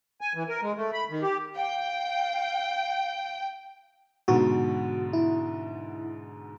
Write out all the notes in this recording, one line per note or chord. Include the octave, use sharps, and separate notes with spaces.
G#5
E3
A#4
G#3
A3
B5
D#3
G4
F5 G5
G#2 B2 D3 F#4
E4